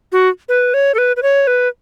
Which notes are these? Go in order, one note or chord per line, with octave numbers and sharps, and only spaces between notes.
F#4
B4
C#5
A4
B4
B4
C#5
B4